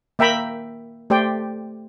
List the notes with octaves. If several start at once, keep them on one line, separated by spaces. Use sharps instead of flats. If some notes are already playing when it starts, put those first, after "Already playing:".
A#3 E5 G5 A#5 B5
A3 G4 C5 D5 G5